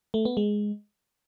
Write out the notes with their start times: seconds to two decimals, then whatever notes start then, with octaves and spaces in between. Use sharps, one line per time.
0.14 A3
0.25 B3
0.37 G#3